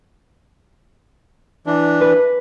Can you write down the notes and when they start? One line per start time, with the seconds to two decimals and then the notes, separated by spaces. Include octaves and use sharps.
1.66 E3 D4
2.01 B4